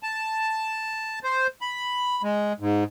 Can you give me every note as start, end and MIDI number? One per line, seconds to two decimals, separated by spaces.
0.03 1.19 81
1.24 1.47 72
1.61 2.22 83
2.23 2.53 56
2.60 2.84 44